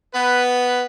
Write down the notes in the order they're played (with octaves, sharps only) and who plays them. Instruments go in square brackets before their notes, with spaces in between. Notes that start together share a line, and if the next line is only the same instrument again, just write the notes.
[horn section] B3 B4